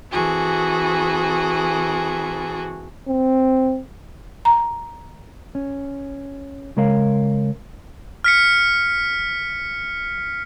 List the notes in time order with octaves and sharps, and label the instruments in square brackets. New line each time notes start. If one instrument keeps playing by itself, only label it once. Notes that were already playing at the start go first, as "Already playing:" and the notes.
[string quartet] E3 C4 F#4 G#4 A4
[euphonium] C4
[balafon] A#5
[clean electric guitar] C#4
C#3 G#3 A#4 C#5 F5
[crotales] F6 B6 C#7